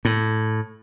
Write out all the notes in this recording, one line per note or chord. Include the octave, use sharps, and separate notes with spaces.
A2